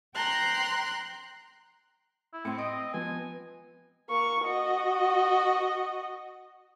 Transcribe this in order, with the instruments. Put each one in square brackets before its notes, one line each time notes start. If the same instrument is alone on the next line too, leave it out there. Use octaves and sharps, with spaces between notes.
[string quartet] G5 A#5 C6 F#6
[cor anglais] E4
[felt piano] A2 C#7 [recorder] C4
[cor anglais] D#5 [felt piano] D#6 D7
[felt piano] F3 B3 [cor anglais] G#5
[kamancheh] A#3 C#6
F#4 D#5